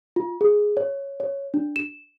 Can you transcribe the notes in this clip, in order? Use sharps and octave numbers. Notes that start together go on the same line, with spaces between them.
F4
G#4
C#5
C#5
D4
E7